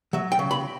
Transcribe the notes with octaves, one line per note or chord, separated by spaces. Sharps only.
F#3 E5
G5
C#3
B5